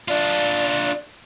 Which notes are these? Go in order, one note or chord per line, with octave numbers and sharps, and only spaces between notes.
D4 F4 D5